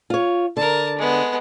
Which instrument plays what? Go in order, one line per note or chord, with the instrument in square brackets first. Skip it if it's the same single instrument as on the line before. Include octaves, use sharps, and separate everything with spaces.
[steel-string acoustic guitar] F4 C#5
[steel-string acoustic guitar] D3 [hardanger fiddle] A#4 A5
[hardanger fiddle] G#3 B3